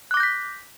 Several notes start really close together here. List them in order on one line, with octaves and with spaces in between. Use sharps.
F#6 D6 A#6 G6 B6